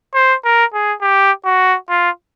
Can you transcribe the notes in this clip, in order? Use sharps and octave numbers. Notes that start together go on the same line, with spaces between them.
C5
A#4
G#4
G4
F#4
F4